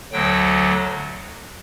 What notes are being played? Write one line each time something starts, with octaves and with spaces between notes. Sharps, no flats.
D2 D3 F#3 G5